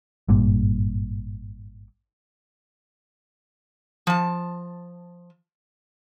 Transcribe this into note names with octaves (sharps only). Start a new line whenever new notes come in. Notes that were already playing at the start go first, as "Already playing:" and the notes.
G#1 G2 A#2
F3 A5